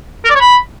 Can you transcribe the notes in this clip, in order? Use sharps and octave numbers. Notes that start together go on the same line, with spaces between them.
A#4
D5
C#5
B5